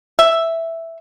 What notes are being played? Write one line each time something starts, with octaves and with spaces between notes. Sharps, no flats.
E5